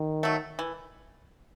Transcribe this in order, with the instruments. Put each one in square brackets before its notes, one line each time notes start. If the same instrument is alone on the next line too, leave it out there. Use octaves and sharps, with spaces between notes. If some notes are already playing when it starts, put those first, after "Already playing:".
Already playing: [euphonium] D#3
[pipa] F#3 A3
E3